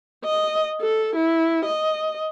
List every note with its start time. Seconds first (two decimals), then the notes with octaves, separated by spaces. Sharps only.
0.24 D#5
0.81 A4
1.16 E4
1.65 D#5